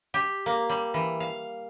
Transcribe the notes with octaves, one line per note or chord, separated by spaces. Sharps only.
G4
A#3
G3
E3
F5